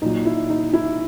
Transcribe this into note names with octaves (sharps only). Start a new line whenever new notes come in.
A#2 F#3 D#4
E4
D#4
E4